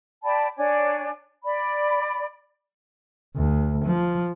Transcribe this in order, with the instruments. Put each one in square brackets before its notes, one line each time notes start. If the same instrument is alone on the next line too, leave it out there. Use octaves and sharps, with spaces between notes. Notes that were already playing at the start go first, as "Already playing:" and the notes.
[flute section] D5 G5 A5 B5
D4 C#5 D5 G#5
D5 B5
[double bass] D2
F3